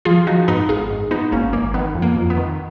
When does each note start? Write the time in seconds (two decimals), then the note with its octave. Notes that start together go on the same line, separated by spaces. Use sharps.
0.05 F3 F4 G#4
0.27 F3 D#4 F#4
0.48 G#2 B3 D#4
0.69 G#1 F4 G#4
0.90 G#2
1.11 G#2 B3 D#4
1.32 G#1 A#3 C#4
1.53 G#1 A#3
1.74 D#3 B3
1.95 F2
2.02 A#3
2.17 F2
2.30 B3
2.37 D#3